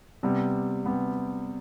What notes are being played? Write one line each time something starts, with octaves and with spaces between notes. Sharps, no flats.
C3 G3 B3
C3 G3 B3